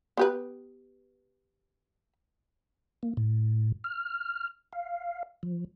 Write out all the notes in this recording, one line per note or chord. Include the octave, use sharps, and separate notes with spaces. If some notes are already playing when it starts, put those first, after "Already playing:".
B3 G4 B4
A#3
A2
F6
F5
F3